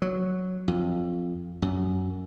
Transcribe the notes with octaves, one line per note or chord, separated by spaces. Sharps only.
F#3
F2
F#2